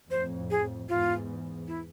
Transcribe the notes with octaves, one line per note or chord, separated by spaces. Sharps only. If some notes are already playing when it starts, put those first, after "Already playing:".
F2 A2 C5
G#4
E2 G#2 F4
E4